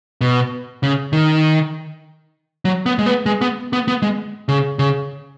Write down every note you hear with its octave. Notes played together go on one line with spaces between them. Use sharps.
B2
C#3
D#3
F#3
B3
G#3
B3
G#3
B3
B3
B3
G#3
C#3
C#3